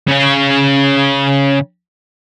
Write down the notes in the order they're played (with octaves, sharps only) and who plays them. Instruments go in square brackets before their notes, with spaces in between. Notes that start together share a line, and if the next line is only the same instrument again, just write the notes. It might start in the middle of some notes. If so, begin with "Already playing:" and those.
[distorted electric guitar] C#3 C#4